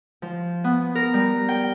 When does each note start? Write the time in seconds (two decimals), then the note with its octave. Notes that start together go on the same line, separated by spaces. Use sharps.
0.22 F3
0.64 B3
0.95 A#4
1.14 G3
1.49 G5